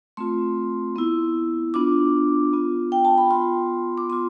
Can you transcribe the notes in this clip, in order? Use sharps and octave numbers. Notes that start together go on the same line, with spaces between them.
A3 C4 F4 C6
B3 E4
B3 D4 F4 D6
B3 F4
G5
A5
B5
B3 F4 C6
D6
B3 F4 C6